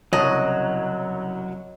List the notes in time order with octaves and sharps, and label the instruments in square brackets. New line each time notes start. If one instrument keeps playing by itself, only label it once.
[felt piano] F#1 C2 A5 [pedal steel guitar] F#3 [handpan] C#5 [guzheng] D#5